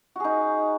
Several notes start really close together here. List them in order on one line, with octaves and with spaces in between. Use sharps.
F#4 G#4 D#4